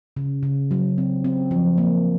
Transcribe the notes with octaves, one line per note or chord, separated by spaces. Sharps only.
C#3
C#3
F#3
C4
C4
F3
A#3